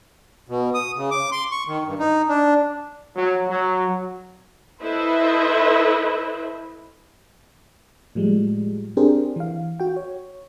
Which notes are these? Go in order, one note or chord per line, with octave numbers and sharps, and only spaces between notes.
B2
D#6
C#3
D6
C6
C#6
D#3
G2
D#4
D4
F#3
F#3
E4 A4 B4 C5 D#5 E5
A2 F3 G3 G#3
C4 D4 G4 G#4 A#4 C5
E3 F5
F#4 G5
C#5